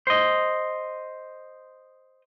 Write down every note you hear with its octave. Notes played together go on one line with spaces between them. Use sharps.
C5 D#5